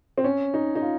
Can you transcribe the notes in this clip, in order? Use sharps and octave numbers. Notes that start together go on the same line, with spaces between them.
C4
C#4
D#4
D#4
F4